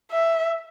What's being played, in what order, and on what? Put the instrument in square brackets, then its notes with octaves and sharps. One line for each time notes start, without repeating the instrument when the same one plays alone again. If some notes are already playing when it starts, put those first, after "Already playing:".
[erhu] E5